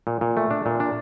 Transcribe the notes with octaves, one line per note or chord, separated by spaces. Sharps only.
A#2
A#2
A3
D4
A#2
D4